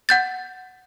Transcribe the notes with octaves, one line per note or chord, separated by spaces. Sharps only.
F#5 G6 A6